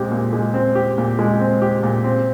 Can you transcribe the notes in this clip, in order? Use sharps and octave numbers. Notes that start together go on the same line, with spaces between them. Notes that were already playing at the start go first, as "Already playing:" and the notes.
Already playing: A#2 G#3 C4 G4
A#2
G#3
C4
G4
A#2
G#3
C4
G4
A#2
C4